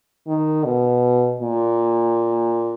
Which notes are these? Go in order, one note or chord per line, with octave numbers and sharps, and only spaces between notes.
D#3
B2
A#2